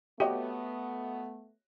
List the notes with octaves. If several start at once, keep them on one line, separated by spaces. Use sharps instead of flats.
A3 B3 F#4 G4 C#5 D#5